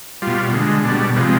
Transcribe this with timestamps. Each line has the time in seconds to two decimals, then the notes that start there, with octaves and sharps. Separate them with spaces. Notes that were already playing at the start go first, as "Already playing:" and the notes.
0.22 B2 G3 F4
0.53 D3 G#3
0.85 B2 D4
0.90 G3
1.16 C3 F3 G#3 B3